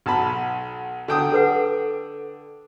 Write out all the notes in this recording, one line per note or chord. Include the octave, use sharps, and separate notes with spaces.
B1 A5 B5
D3 G5 D#6
A4 B4 F#5